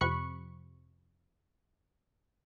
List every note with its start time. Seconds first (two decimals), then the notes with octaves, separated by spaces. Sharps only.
0.01 F2 C3 B5 C#6 F#6 C#7